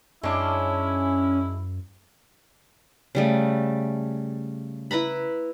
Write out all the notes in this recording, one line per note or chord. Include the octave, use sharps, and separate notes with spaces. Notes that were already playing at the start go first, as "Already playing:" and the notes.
F#2 G#3 C#4 D4 E4
C#3 G3 A3
E4 B4 A#5 B5